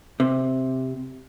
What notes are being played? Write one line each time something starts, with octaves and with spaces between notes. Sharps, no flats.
C3